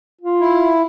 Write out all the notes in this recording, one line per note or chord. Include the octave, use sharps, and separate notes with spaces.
F4
E4